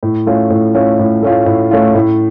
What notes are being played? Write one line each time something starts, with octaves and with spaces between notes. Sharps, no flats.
A2
A3 C#4 F4
A2
A3 C#4 F4
A2
A3 C#4 F4
A2
A3 C#4 F4
A2